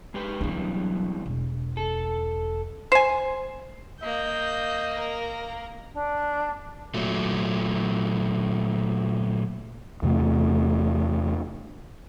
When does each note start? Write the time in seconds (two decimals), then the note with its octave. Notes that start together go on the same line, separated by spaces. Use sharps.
0.14 G#3 G4 B4
0.41 G2 B2 E3 F#3 D4
1.26 E1
1.77 A4
2.92 C5 G#5
4.03 A#3 D#5 G6
4.94 A#4
5.95 D4
6.94 A#2 F#3 A3
10.03 E2 C3 A3